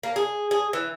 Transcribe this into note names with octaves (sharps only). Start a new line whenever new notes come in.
A#3
G#4
G#4
E3